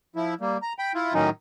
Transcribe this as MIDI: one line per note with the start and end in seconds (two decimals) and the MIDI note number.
0.16 0.34 53
0.16 0.34 64
0.41 0.57 55
0.41 0.57 58
0.62 0.73 82
0.79 0.93 79
0.79 0.93 83
0.95 1.13 64
0.95 1.13 65
1.14 1.30 45
1.14 1.30 51
1.14 1.30 54
1.14 1.30 61
1.14 1.30 63